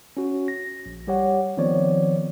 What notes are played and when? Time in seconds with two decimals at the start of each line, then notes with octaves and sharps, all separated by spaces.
0.17 C#4 F#4
0.48 A#6
0.86 A#1
1.07 G3 G4 C#5 F#5
1.57 D#3 F3 B3 C4 C#5 D5